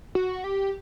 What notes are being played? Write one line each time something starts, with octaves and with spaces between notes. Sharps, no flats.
F#4
G4